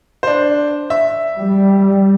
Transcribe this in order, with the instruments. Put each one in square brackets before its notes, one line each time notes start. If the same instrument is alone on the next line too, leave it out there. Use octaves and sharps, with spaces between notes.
[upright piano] D4 C5
E5
[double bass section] G3